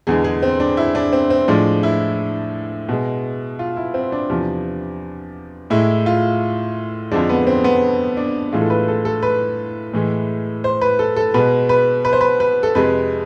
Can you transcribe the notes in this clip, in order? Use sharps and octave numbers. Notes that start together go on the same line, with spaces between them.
E2 D3 G#3 G#4
G#4
C4
D4
E4
D4
C4
C4
A2 F3 G#3 D4
E4
B2 G#3
F4
E4
C4
D4
E2 C3 F3
A2 G#3 E4
F4
F2 D3 F3 G#3 D4
B3
C4
B3
D4
A2 E3 G#3 F4
A4
B4
A4
A4
B4
A2 E3 G#3
C5
B4
A4
A4
B2 G#3 B4
B4
B4
C5
B4
B4
A4
F2 C3 G#3 B4